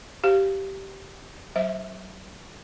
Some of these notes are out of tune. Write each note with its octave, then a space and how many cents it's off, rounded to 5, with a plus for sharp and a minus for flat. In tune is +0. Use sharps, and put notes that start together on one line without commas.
G4 -15 C5 +0 F5 -5
F#3 +30 C5 +5 E5 -35